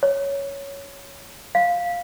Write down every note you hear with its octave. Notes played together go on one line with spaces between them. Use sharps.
C#5
F5